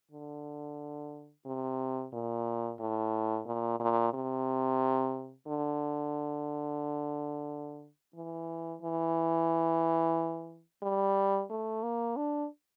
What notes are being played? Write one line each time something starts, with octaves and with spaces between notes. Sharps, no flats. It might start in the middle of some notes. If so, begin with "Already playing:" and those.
D3
C3
A#2
A2
A#2
A#2
C3
D3
E3
E3
G3
A3
A#3
D4